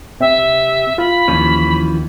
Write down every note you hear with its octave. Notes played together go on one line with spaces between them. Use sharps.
C3 E5
F4 B5
D#2 E3 F3 C#4